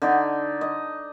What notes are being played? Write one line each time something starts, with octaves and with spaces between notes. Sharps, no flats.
D3 D#4 D5
D#5